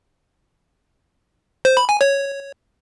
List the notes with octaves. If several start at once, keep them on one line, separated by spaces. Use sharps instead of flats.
C5
B5
G#5
C#5